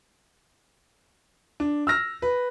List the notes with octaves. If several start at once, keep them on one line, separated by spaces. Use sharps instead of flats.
D4
E6 F6 A#6
B4